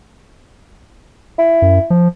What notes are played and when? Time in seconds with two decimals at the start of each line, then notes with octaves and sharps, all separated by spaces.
1.38 E4
1.62 F#2
1.90 F3